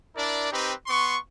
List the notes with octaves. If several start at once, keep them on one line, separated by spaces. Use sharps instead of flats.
D4 E4 A#4 D5
C4 D#4 G4 B4
B3 C6 C#6